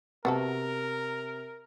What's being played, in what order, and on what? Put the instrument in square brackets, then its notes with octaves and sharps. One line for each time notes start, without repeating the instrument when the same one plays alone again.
[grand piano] C3 [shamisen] B3 F#4 A4 [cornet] A#4